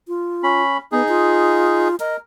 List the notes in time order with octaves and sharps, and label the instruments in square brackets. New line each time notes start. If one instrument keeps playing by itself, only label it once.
[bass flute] F4
[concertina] C#4 B5
[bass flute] B3 [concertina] D#4 G#4
[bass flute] F4
[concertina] A#4 [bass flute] D#5